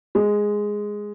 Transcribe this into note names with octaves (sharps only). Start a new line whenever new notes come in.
G#3